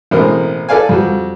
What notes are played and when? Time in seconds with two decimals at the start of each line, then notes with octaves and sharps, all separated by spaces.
0.11 A1 B2 G#3 C4 A#4
0.69 A4 B4 D5 F5 G#5
0.89 F2 G3 F#4